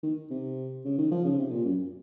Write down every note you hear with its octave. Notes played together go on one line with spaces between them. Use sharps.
D#3
C3
C#3
D#3
F3
C#3
C3
A#2
F#2